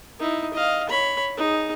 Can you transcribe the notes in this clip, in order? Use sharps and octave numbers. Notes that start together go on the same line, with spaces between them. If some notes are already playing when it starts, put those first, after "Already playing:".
D#4 E4
D#5 F5
C#5 B5
D#4 G#4